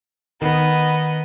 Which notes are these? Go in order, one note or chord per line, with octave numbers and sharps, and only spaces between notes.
D#3 B3 D#5